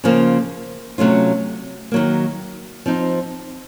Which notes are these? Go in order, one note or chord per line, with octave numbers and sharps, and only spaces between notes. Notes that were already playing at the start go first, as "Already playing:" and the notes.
C#3 F3 A#3
C3 F#3 A3 C#4 F4
D#3 F#3 A#3
F3 C4 D#4